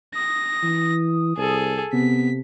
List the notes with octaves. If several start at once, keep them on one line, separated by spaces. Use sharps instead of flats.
D#6 A#6
E3
C2 G#4 A4
C3 B3 B6